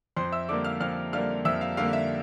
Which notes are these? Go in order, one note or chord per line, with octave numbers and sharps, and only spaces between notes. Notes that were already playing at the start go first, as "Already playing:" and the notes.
F2 C5 C6
E5 E6
D3 G3 A#3 D5 D6
F5 F6
F2 F5 F6
D3 G3 A#3 F5 F6
F2 E5 E6
F5
D3 G3 A#3 F5
E5